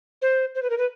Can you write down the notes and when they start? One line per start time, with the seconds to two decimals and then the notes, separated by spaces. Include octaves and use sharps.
0.22 C5
0.55 C5
0.63 B4
0.70 A#4
0.78 B4